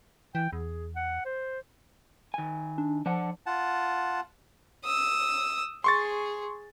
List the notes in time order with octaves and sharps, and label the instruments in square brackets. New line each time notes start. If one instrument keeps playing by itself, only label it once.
[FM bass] E3 [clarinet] G5
[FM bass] E2 [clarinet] G#4
[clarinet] F#5
C5
[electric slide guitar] D#3 G#5
[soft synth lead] D4
[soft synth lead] F3 [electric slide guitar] D4 F#5
[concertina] F4 F#5 A5
[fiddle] D#6 E6
[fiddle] G#4 [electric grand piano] C6 C#6 A6